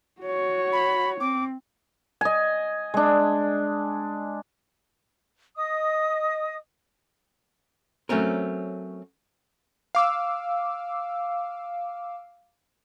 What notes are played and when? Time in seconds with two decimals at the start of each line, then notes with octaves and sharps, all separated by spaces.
0.22 F#4 C#5
0.72 B5
1.20 C4 D6
2.21 D#5 G#5
2.94 G#3 D4
5.56 D#5 D#6
8.09 F#3 A3 C4 C#4 A#4
9.95 F5 D6 E6